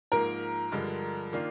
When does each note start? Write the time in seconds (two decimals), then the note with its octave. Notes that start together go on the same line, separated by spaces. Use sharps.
0.12 G#2 F3 A#3 A#4
0.72 G2 D3 F3 G#3
1.33 D#3 A#3 D4 F4